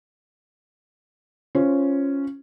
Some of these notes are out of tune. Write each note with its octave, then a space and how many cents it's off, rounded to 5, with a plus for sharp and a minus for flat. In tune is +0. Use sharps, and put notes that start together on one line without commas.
C#4 +0 F4 -15 C5 +0